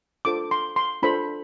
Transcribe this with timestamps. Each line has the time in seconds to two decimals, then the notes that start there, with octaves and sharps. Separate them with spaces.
0.25 D4 F4 A4 C5 D6
0.51 C6
0.76 C6
1.03 D4 F4 A4 C5 B5